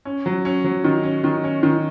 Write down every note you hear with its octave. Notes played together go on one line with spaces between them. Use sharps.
C#4
F#3
C#4
F#3
D#3
C#4
D#3
C#4
D#3